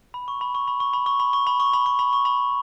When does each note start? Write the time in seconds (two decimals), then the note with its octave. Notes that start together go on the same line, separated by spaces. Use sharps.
0.14 B5
0.28 C#6
0.41 B5
0.55 C#6
0.68 B5
0.80 C#6
0.93 B5
1.06 C#6
1.20 B5
1.33 C#6
1.47 B5
1.60 C#6
1.73 B5
1.86 C#6
1.99 B5
2.13 C#6
2.25 B5